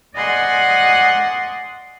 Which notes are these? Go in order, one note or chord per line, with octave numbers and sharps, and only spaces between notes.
D5 D#5 F#5 G#5 C6